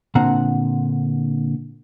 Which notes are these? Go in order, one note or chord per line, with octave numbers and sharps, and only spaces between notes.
A#2 D3 C4 F#5 A#5